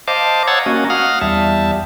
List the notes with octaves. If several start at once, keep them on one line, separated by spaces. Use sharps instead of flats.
C5 D#5 F5 A5 D6
C#5 F#5 A#5 E6 G#6 A6
A#3 C#4 F#4 D#5
F5 F#5 D#6 F6
E2 G3 E5 A5